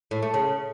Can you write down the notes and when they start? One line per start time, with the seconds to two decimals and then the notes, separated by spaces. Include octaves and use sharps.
0.11 A2
0.22 A3
0.34 C#3